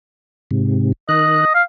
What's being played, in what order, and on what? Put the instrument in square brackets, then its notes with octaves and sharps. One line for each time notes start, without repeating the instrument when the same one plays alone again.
[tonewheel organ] G#2 C3
[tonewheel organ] D#3 F#6 [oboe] D#5
[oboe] F5